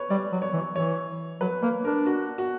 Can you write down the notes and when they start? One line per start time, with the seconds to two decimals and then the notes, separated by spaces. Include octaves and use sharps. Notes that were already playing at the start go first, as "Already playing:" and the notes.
Already playing: B4 C#5
0.10 G3 D5
0.32 F#3
0.42 C#5
0.53 E3
0.58 C#5
0.76 E3 C#5
1.41 F#3 B4
1.62 A#3 B4
1.84 D4 A#4
2.06 F#4
2.38 F#4